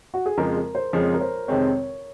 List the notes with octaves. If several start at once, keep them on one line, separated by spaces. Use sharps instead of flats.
F#4
G#4
F2 C#3 F3 G#3 A#4
A#4
C5
F2 C#3 F3 G#3 C#5
A#4
C5
F2 C3 D#3 G#3 C4 C#5